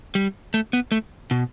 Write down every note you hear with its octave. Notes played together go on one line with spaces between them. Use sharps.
G3
A3
B3
A3
B2